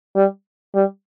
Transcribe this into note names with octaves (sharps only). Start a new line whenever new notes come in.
G3
G3